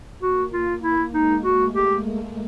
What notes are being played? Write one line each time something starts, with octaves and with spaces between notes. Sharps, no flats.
A#3 F#4
F4
E4
G#3 D#4
F#4
A3
G4